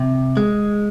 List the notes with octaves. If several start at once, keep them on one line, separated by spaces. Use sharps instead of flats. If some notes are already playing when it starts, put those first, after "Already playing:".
Already playing: C3
G#3